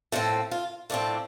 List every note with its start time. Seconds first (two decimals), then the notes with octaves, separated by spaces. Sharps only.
0.12 A2 F3 C4 A4
0.51 F4
0.90 A2 F3 C4 D4